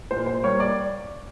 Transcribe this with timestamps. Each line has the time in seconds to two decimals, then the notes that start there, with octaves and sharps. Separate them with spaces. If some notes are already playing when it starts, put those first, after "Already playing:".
0.11 A#2 C5
0.26 C5
0.43 G3 A#3 C#5
0.60 D5